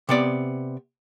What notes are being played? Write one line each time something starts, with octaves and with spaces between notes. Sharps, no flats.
C3 B3 D5